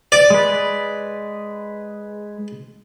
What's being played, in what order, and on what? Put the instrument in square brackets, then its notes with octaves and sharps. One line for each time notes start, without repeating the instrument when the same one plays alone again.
[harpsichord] D5
[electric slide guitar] G#3 B4